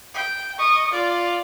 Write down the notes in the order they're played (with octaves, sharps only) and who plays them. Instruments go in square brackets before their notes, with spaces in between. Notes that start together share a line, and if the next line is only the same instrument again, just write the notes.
[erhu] G5
[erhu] D#5 [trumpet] C#6
[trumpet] F4 [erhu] D5